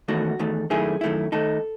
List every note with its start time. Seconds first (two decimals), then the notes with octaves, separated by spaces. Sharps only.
0.08 E2 D#3 A3 F#4
0.39 E2 D#3 A3
0.70 F#2 D#3 A3 E4 G#4
1.01 F#2 D#3 A3 E4
1.32 D#3 A3 D#4 A4